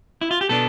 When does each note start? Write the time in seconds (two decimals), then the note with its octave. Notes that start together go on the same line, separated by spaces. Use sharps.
0.21 E4
0.31 F4
0.41 G4
0.49 B2 B3 D4 A4